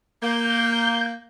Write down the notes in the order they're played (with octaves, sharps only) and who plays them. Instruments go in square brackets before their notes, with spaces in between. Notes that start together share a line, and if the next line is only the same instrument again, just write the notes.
[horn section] A#3 [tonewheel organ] G6